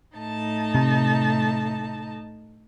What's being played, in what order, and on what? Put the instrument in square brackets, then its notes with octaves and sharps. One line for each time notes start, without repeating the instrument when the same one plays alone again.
[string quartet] A2 D#4 A5
[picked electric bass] C3